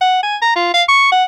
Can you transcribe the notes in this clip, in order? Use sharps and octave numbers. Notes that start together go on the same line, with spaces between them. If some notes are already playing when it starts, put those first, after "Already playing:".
F#5
G#5
A#5
F4
F5
C#6
F#5